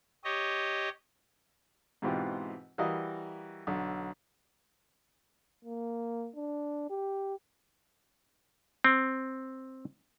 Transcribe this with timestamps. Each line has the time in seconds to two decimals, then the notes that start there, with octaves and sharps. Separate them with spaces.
0.24 G4 C#5 D#5
2.02 G#2 B2 E3 C4 F4 G4
2.78 E3 G3 F#4 A#4 D#5 F5
3.67 B1 D3
5.65 A#3
6.36 D4
6.90 G4
8.84 C4